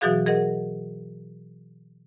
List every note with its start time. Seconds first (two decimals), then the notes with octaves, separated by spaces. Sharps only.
0.01 B2 E3 F#3 F#4 G#4 F5
0.26 G#4 A#4 D#5 F#5